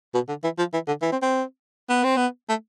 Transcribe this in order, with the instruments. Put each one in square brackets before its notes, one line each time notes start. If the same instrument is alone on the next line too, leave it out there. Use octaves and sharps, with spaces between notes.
[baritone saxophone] B2
D3
E3
F3
E3
D3
E3
C4
C4
B3
C4
B3
A3